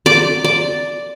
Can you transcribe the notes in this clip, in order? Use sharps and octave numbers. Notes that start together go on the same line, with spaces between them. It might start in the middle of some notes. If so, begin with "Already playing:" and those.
D5
D5